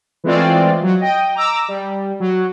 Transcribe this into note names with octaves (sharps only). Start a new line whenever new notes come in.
E3 G#3 A3 C4 F4 D5
F#3
D#5 G5
A#5 D6 E6
G3
F#3